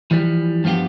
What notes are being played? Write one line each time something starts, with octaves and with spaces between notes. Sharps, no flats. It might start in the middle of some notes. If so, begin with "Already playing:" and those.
E3 F3 G3
G2 F3 B3 F4 G4